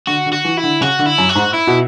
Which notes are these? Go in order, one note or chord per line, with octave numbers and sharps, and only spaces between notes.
D3 F#4
D3
F#4
E3
E4
D3
C#3 F#4
D3
E4
F#2
F#4
G#2
E4
B2